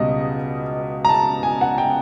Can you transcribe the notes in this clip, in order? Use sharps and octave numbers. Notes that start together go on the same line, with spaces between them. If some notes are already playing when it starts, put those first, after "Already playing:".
Already playing: C#2 B2 G3 D#5
A#5
A5
G#5
F#5
G5